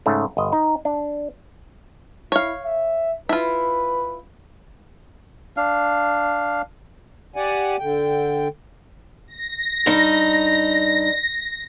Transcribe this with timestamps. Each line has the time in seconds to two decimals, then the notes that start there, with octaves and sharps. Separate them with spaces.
0.06 G#2 C#3 A3
0.37 G1 D#5
0.53 D#4
0.85 D4
2.32 E4 C#5 F5
2.63 E5
3.29 E4 F4 B4
5.57 D4 F5
7.36 G4 D5 F#5 G#5
7.79 D3 G5
9.28 A#6
9.86 G2 D#4